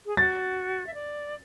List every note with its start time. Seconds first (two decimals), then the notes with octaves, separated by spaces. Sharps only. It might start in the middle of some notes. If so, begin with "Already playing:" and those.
0.06 G#4
0.17 F#4 A6
0.86 E5
0.94 D5